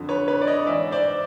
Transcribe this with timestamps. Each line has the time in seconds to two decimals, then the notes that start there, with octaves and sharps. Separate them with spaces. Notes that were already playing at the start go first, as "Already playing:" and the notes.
Already playing: F2 D3
0.09 B4 C#5
0.28 B4 C#5
0.41 D5
0.47 C#5 D#5
0.66 G#2 E3 D5 E5
0.91 C5 D5